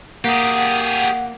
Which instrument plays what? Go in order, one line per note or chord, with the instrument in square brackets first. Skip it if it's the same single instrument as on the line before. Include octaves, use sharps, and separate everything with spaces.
[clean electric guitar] A#3 [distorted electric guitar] G4 G#4 [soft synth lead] F#5